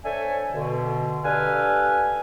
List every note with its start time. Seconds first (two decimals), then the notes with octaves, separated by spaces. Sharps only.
0.04 D4 A4 C5 C#5 E5 G#5
0.54 B2 D3
1.24 D4 G4 A4 B4 F5 G#5